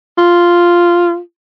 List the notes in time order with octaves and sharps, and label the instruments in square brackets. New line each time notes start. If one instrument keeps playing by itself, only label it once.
[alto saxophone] F4